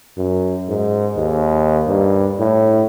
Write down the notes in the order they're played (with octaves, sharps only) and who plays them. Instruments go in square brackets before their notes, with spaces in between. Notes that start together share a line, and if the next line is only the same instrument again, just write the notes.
[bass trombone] F#2
G#2
D#2
G2
A2